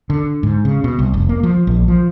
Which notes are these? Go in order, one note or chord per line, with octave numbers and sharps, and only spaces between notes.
D3
G#2
C#3
B2
C2
F1
A#3
F3
A#1
F3